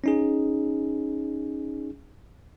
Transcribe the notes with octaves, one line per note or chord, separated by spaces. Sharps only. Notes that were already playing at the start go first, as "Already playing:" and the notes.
C#4 D#4 G#4